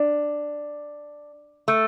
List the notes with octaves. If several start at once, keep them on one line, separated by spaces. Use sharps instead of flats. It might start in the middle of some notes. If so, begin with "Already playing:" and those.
Already playing: D4
A3